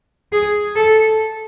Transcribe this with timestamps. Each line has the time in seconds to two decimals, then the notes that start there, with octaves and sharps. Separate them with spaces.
0.32 G#4
0.76 A4